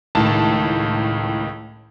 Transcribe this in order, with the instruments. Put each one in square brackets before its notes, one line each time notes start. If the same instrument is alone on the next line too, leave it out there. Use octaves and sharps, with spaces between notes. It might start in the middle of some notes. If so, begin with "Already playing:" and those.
[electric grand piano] C#2 D#3 [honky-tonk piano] A2 A5